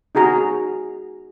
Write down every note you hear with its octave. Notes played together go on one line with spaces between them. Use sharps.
D#4 F#4 G#4 A#5